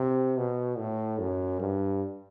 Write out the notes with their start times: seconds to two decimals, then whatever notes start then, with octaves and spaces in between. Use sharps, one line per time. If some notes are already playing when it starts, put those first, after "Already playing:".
Already playing: C3
0.37 B2
0.78 A2
1.19 F#2
1.60 G2